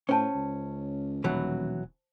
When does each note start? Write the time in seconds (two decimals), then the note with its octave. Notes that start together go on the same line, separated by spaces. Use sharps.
0.09 A2 C#4 C5 G5 A5
0.34 C#2
1.24 D#1 B2 E3 F#3